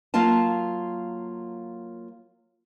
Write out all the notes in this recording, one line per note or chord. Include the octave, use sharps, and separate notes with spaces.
F#3 A#3 F4 F5 A5